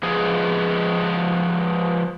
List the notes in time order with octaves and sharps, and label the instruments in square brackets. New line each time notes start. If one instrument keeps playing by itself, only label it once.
[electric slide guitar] F3 G#3 B3 G#4